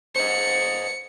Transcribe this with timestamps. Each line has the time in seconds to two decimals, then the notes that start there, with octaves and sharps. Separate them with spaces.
0.16 C5 D#5 C#7